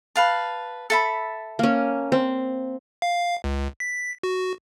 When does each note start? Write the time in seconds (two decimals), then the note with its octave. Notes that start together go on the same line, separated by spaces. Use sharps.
0.16 B4 F5 A5
0.90 A4 E5 B5
1.59 A#3 C#4
2.12 C4
3.02 F5
3.44 C#2
3.80 B6
4.23 F#4